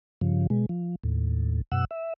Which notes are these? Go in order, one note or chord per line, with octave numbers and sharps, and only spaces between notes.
G2 C#3 F3
B2 G#3
F3
D#2 A2
F#2 B2 F#5 E6
E5